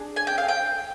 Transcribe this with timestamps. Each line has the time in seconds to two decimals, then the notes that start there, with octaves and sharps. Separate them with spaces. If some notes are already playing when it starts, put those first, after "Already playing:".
Already playing: D4 G#4
0.16 G#5
0.27 G5
0.38 F5
0.48 G5